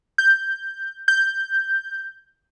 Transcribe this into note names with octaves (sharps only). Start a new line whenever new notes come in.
G6
G6